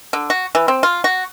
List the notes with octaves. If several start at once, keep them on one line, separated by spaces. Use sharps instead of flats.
D3
F#4
E3
C4
F4
F#4